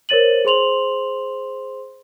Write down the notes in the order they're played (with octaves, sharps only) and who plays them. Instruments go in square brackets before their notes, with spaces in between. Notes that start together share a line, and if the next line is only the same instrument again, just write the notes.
[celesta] A#4 C5 C#5 A6 D#7 F#7
G#4 C5 C6 F7 F#7